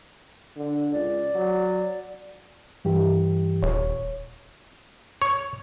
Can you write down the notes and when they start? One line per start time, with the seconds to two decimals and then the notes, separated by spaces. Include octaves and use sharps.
0.56 D3
0.92 C#2 D5
1.35 F#3
2.85 G2 E3 G4
3.63 D#1 C#5
5.22 C#5